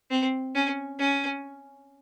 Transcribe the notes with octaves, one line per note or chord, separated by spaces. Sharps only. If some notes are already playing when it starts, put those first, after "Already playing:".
C4
C#4
C#4